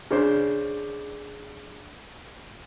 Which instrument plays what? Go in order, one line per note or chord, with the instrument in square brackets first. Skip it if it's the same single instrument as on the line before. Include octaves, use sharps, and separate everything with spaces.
[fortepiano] C#3 D4 C5